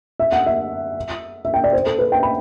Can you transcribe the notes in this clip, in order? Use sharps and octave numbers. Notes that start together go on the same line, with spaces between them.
E5
F#5
E5
E5
G5
D5
C5
A4
B4
G5
B5